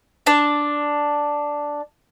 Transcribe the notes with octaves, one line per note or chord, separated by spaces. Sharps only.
D4 A5